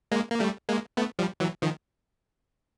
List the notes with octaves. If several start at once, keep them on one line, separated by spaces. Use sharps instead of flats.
G#3 A#3
A#3
G3 A3
G#3 A#3
A3 B3
F3 G3
E3 F#3
D#3 F3